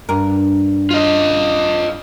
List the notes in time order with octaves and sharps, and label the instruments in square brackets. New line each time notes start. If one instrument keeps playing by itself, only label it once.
[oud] G2 A#4
[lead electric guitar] F4 D#5